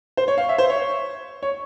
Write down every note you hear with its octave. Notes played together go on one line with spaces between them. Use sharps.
C5
C#5
F5
E5
C5
C#5
C#5